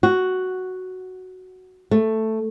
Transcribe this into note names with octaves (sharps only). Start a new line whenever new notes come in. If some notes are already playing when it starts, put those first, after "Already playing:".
F#4
A3